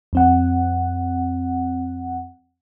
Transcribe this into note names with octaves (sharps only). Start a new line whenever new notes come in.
F2 C4 F#5